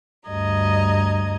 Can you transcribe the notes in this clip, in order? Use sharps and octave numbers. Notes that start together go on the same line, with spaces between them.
D2 G2 D#5 A#5 G#6